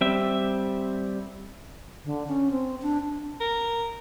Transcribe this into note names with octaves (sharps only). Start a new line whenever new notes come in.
G3 C4 E5
D3
C#4
C4
D4
A#4